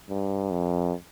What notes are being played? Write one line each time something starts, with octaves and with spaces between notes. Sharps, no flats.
G2
F2